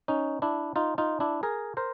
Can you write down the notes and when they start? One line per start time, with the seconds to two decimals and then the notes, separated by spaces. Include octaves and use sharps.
0.08 C#4 D#4
0.42 D4 E4
0.76 D#4 F4
0.98 D#4 F4
1.20 D4 E4
1.43 G#4 A#4
1.77 A#4 C5